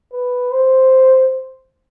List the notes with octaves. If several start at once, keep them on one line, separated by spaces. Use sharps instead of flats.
B4
C5